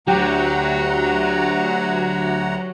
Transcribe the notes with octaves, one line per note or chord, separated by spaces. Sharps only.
D2 F#3 G4 F#5 A#5